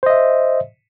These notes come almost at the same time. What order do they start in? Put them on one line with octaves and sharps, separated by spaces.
C5 D#5 E5